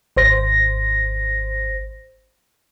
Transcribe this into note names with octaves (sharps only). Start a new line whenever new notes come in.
G#1 C5 A#6